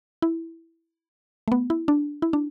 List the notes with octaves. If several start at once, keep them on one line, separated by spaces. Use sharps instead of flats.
E4
A3
B3
E4
D4
E4
D4